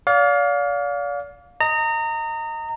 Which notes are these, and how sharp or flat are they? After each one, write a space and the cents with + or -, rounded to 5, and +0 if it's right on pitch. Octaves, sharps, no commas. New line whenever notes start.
D5 -40 F5 +20
D#5 +0 A#5 -25